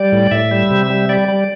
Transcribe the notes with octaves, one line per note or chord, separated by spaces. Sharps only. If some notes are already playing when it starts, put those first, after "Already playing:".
Already playing: G3 D5
A2
A2 E5
G3
C3
G3
G3 D5
G3